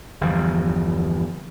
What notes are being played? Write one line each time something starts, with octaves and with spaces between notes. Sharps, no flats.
G1 E2 F3